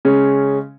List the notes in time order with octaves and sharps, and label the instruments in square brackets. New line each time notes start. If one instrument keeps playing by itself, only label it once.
[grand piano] C#3 G#3 C#4